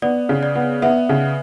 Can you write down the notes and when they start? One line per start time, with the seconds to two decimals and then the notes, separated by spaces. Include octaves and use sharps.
0.02 B3 D5
0.29 C#3
0.43 D5
0.55 B3
0.82 B3 E5
1.09 C#3